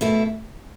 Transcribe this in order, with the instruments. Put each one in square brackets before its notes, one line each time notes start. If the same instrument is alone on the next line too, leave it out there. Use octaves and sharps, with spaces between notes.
[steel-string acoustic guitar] B2 A3 E4